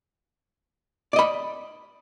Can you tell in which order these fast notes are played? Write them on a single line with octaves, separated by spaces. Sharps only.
D5 D#5 B5